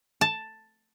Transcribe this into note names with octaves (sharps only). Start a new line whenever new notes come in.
A5